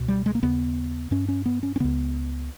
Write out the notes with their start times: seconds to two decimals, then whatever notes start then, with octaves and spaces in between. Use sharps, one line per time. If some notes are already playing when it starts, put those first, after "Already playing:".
Already playing: C#2 B2
0.08 G3
0.26 G#3
0.35 A#3
0.43 D#2 C#3 B3
1.11 G2 C#4
1.28 C#4
1.46 B3
1.63 C#4
1.76 C#4
1.80 C#2 C#3 B3